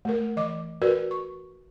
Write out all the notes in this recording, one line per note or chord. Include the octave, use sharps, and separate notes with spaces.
A3 A#4
E3 D#5 D6
F#4 A#4 B4 D5
C#6